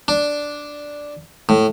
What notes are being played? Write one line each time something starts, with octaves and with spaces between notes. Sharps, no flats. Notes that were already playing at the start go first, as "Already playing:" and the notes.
D4
A2